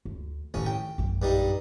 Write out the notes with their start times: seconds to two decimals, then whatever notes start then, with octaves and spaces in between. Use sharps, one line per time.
0.05 D2
0.54 A1 D3 D#3 C#4
0.66 G5
0.98 A#1 F#2
1.22 G2 G3 D#4